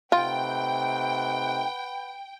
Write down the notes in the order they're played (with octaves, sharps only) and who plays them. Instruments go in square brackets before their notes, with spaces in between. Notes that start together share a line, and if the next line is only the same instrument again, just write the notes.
[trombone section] C3 A3 D#4 [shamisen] F4 [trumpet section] B4 F#5 [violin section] G5